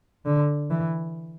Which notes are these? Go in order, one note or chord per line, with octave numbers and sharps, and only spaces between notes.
D3
E3